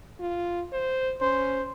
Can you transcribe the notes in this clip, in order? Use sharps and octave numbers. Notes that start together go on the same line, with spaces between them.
F4
C5
C#4 C5